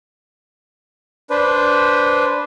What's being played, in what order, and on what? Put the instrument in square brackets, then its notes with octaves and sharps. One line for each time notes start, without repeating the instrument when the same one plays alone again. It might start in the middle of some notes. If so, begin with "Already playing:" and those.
[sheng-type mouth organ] D4 B4 C5